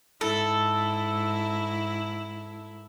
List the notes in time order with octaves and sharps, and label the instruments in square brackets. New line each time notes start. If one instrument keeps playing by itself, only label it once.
[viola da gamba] G#2 E4 [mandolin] A4